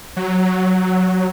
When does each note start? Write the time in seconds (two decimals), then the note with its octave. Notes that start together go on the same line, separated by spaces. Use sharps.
0.16 F#3